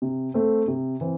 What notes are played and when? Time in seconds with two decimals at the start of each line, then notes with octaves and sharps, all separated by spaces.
0.02 C3
0.34 A3 C4
0.68 C3
1.01 E3 C4